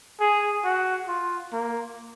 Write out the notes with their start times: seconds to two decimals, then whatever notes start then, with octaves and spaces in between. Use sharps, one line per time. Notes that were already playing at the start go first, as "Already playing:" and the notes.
0.20 G#4
0.64 F#4
1.08 F4
1.53 A#3